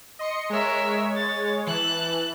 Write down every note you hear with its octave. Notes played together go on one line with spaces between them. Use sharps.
D#5 C6 C#7
G#3 A#4 C#5 E5
A6
E3 A5 F#6